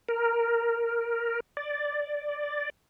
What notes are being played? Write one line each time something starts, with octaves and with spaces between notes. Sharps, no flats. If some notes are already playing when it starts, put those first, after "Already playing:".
A#4
D5